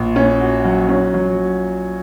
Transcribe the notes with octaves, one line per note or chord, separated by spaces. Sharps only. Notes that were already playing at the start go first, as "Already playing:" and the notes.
Already playing: A#1
C#4
F#4
F#3
C#4
F#3